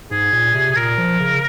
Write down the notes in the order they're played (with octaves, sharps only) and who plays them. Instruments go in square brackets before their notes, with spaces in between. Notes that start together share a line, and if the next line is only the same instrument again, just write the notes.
[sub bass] G#2 [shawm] G#4
[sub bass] A#2
C3
[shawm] G#4
[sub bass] A#2 [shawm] A#4
[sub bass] F3
C#3